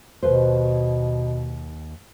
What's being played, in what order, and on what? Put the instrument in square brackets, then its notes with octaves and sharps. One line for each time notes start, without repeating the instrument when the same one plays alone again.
[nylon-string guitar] D#2 B4 C5 [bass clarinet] B2